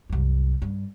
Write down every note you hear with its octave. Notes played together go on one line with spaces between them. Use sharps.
C2 F#2
G2